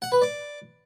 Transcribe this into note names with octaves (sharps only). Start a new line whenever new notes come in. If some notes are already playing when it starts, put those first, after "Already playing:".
F#5
B4
D5